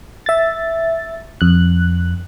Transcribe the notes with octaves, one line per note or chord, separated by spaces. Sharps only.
E5 A6
F2 F#6